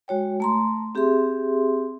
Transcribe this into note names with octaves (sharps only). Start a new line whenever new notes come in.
G#3 F#4 C#5 G5
A3 A#5 C6
C4 G4 G#4 E5 C6